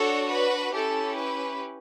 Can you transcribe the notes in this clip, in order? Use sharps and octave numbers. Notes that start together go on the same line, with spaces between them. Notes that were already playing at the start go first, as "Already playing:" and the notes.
Already playing: D4 F#4 A4 C#5
B4
C#4 E4 G4 A4
B4